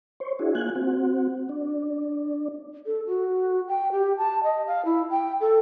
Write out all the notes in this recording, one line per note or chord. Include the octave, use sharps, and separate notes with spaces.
C5 C#5
D4 E4 F#4 G#4
A#3 F4 G#5 F#6
C4 F#4
D4
A4
F#4
G5
G4
A5
D#5
F5
E4
G5
A4